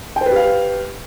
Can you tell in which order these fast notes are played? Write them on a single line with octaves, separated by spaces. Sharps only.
G5 C5 B4 G4 F5